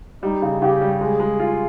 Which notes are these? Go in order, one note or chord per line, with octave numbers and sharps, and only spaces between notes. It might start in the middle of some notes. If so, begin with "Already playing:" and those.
G3 D#4
C#3
C#3 G4
G3
G#3 G#4
G#3
F4